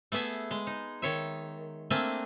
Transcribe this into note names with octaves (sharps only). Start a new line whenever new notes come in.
A3 B3 G#4 E5
G#3
D#4
D#3 C#5 E5
A3 A#3 C4 D4 E5 G#5